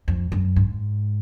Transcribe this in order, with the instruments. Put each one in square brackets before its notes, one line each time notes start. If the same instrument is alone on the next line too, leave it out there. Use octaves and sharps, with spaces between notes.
[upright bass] F2
F#2
G#2